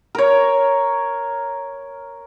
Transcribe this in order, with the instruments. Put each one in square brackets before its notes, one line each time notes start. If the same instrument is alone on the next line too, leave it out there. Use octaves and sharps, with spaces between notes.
[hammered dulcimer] A#4 C#5